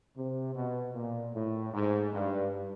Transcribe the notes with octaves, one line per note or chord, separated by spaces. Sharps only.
C3
B2
A#2
A2
G#2
G2